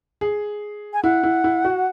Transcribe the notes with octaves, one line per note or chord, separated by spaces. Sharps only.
G#4
G#5
E4 F#5
E4
E4
F#4